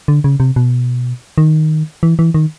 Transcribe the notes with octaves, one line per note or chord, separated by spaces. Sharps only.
D3
C#3
C3
B2
D#3
E3
E3
D#3